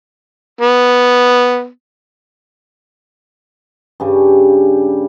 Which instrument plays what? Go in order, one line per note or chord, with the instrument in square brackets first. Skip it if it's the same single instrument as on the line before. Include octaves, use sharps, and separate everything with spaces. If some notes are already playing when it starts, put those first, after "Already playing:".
[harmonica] B3
[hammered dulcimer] G2 C#3 G3